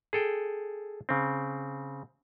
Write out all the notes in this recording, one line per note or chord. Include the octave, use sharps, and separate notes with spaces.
G#4 A4 G5
C#3 C4